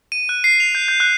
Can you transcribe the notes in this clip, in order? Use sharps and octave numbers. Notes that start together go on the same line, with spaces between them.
D#7
F#6
C7
F7
G6
G6
F#6